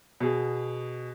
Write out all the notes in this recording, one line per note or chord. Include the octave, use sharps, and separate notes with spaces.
B2 G#4